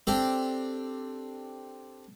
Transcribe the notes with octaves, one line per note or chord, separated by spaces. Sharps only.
C4 D4 G4 A4